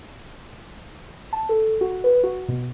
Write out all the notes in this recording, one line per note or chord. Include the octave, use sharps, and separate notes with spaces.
A5
A4
F#4
B4
F#4
B2